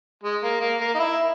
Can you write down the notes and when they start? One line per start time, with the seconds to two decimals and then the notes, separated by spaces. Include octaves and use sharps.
0.23 G#3
0.43 A#3
0.61 A#3
0.81 A#3
0.95 D#4
0.99 E4